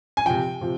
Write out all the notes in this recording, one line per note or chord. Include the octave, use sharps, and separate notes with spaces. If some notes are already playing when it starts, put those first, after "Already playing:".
G#5
C3 F3 G5
C3 F3